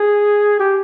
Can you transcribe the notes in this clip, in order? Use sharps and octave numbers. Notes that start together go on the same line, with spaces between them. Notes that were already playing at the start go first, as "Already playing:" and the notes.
Already playing: G#4
G4